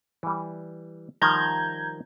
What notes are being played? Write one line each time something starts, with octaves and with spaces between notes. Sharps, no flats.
E3 G3
D#3 F3 G3 A#5 G6 G#6